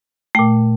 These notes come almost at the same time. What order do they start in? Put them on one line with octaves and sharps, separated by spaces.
A3 G5 A#2